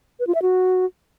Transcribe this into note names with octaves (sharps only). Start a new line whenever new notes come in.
B4
F4
E5
F#4